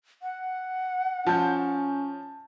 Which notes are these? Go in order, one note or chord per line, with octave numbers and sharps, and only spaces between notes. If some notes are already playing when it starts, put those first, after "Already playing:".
F#5
F3 C#4 A5 G6